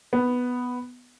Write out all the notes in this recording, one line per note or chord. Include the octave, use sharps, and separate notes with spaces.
B3